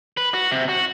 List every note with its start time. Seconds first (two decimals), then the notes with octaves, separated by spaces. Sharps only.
0.17 B4
0.34 F#4
0.51 C3
0.69 F#4